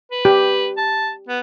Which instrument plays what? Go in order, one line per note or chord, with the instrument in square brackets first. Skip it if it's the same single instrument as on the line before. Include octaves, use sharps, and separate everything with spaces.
[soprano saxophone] B4
[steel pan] G4
[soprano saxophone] A5
B3